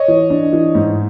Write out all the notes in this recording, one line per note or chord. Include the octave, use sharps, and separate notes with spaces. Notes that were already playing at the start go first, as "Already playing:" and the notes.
Already playing: C#5 D#5
E3
D4
E3
G#2